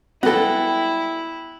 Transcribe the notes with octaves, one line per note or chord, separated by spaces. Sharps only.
G3 G#3 B3 E4 F#4 A4 G5